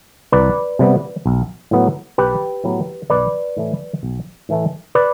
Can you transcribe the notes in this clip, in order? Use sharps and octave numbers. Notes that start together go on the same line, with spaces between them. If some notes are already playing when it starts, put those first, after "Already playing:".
C2 B4 D5
C3 G3 B3
B1
A2 F#3 B3
B1 G4 B4
A2 F#3 B3
B1 B4 D5
A2 E3 A3
B1
A2 E3 A3
B4 D5